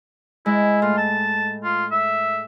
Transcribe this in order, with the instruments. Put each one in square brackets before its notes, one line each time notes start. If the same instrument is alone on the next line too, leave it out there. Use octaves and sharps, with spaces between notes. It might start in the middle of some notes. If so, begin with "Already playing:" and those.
[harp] G#3 [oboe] E4
[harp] A2 [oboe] F4
[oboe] A5
F4
E5